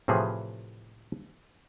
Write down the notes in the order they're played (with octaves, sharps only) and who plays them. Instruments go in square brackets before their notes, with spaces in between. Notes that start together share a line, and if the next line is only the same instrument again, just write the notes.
[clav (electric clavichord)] A2 C3 E3 F3 G#4